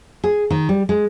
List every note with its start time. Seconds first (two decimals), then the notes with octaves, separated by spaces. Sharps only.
0.24 G#4
0.50 D#3
0.69 G3
0.89 G#3